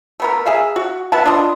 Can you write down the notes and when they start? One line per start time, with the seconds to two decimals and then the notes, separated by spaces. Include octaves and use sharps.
0.20 A3 B3 A#4
0.46 G#4 E5 F5
0.76 F#4
1.12 B3 E5 F#5 A5
1.26 D4 F4 D#5